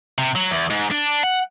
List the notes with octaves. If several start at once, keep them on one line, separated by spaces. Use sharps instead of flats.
C3
F#3
E2
G#2
D4
F#5